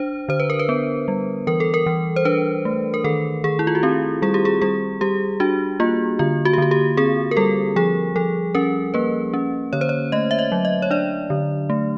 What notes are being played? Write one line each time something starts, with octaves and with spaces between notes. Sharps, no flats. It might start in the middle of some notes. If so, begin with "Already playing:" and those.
Already playing: D4 C5
D3 C5
B4
A#4
B4
B3
G3
E3 A#4
A4
A#4
E3
C5
D4 B4
A3
A#4
D#3 A4
D#3 G#4
E4
F4
F#4
C4 G4
G3 G#4
G4
G#4
G3 G#4
G3 G4
D4 F#4
A#3 F4
D3 F4
F#4
G4
D3 F#4
G4
C4 G#4
A#4
G3 A4
F3 G#4
F3 A4
C#4 A#4
A#3 B4
C#4
D3 C#5
C5
C#5
A3 D#5
E5
D#5
F#3
D#5
C#5
D4 D5
D3
A3